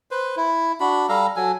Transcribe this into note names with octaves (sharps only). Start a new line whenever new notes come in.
B4 C5
E4
D4 F#4 B5
G3 A4 F5 A#5
F#3 A4 G#5